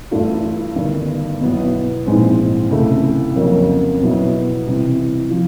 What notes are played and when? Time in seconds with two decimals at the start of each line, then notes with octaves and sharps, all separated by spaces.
0.11 G2 E3 A3 D4 F4
0.76 G1 G2 D#3
1.40 B1 B2 F#3 B3 E4
2.06 A#1 G#2 E3 G#3 C4
2.71 C#2 C3 E3 A3
3.36 F2 C#3 F#3 A#3
4.01 B2 F#3 B3 E4
4.66 C3 E3 G3
5.31 F3